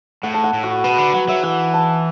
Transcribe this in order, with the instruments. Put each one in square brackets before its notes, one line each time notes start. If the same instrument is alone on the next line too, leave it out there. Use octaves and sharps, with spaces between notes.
[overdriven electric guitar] A2 [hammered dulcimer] F#5
[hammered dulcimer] A5
F#5
[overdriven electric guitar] A2
[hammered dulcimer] F#4
[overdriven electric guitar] B2 [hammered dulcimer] B4
[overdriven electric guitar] D3
[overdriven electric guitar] F#3 [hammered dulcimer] F#5
[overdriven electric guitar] F#3 [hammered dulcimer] E5
[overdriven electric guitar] E3 [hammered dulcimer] F#5
[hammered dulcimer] A5